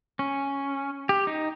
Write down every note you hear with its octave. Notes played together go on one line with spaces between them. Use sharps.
C#4
G4
D#4